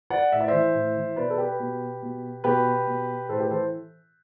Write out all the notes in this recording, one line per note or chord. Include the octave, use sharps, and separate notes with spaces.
D5 F#5
A2 E5
D5
E3 C5 E5
A2
E3
B2 B4 D5
A4
G4 B4
B2
B2
B2 G4 B4
B2
A2 A4 C5
G4 B4
E3 A4 C5